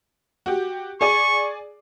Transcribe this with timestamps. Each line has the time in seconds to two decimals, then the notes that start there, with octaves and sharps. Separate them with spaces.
0.46 F#4 G4
1.01 G#4 D5 G#5 C#6